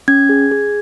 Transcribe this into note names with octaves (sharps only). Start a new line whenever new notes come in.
C#4 G#6
G#4
G#4